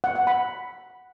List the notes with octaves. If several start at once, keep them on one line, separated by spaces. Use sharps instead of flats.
F#5
F#5
B5